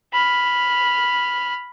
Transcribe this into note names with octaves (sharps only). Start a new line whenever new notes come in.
B5 F6